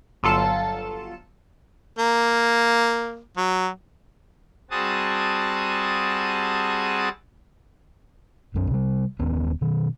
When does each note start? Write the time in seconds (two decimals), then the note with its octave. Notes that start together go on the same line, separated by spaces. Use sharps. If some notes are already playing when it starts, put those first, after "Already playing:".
0.23 G1 F#3 F4 A4 A5 E7
1.99 A#3
3.37 F#3
4.71 G3 C4 F#4 G#4 A5 D#6
8.54 B1 F#2 C#4
8.71 C3 G3
9.19 D#1 D#2 B3 C#4
9.61 B2 D#3